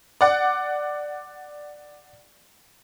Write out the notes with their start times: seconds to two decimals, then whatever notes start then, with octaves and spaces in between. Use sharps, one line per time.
0.21 D5 F#5